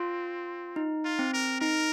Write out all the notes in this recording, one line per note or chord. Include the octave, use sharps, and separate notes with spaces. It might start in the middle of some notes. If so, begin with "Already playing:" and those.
Already playing: C4 F4
D#4
F4
C4
A#4
D#4 A#4